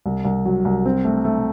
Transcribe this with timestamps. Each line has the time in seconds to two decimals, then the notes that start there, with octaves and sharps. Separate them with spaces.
0.06 C2
0.25 C2
0.45 F#3
0.65 C2
0.86 C4
1.05 A3
1.25 A3